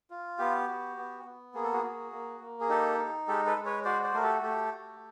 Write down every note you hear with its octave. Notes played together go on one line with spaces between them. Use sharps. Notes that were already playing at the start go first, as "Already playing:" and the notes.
F4
B3 G4
F#4
B3
B3
A#3 G#4
A4
F#4 G#4
F#4
A#3
A#3
G#4
D#4 G4 A4
D#4
G#3 G4 A4
A4 B4
G#3
B4 C#5
F#4 C5 D5
C5 D5
A3 A#4
G4 A4
A3 G4 A4
F#4